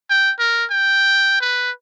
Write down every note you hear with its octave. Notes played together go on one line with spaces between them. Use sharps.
G5
A#4
G5
B4